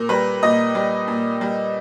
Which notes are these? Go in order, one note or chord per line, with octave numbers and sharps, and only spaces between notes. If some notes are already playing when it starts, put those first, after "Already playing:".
Already playing: A#2 A#4
G3 B4
A#2 D#5
G3
A#2
G3